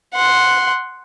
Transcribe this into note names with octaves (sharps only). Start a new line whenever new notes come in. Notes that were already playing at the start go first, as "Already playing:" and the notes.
F#5 C6